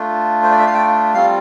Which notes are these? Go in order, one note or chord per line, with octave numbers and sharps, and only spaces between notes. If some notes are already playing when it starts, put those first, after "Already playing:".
Already playing: A3 D4 F4
C5
D5
E5
F5
G5
G3 C4 F4 F5